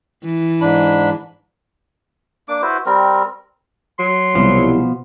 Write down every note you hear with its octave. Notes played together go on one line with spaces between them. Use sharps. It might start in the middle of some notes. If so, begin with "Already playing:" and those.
E3
G#2 D4 B5
A#3 D4 D6
E4 F#4 B4 C5
G3 C4 A#4
F#3 C6
C2 B2 F3